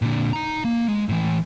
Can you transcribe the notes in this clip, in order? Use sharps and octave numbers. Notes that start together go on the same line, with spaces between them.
A#2 D3
D#4 A#5
A#3
G#3
A2 E3